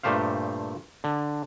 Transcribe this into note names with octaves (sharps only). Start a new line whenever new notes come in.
G2 A#2 A3 G4 C5 F5
D3